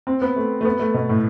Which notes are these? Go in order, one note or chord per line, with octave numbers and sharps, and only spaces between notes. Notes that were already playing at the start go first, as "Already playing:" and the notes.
C4
B3
A3
A3
B3
A3
B2
A2